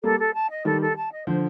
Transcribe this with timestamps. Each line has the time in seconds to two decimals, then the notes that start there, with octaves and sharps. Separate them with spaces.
0.03 G3 A#3 A4
0.19 A4
0.34 A5
0.50 D#5
0.65 D#3 G3 A4
0.81 A4
0.96 A5
1.12 D#5
1.27 D3 F3 C5